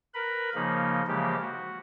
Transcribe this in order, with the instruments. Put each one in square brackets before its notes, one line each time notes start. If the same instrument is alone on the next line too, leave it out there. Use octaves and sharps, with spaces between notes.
[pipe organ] A#4 B4 B5
C#3 F3 A#3 D#4
C#3 E3 F3 G#3 A#3 G4
F#4